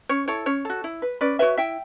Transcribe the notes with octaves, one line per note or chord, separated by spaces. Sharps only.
C#4 C#5
E4 A4 C#5
C#4 C#5
F#4 A4
E4
B4
C#4 B4 D5
F#4 B4 C#5 E5
E4 E5 G5